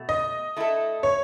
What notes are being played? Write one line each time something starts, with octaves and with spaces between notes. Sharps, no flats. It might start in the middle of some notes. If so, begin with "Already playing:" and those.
Already playing: B2 A3
D#5
A3 E4 A4
C#5